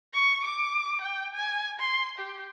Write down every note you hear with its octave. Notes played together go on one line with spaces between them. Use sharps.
C#6
D6
G5
G#5
C6
G4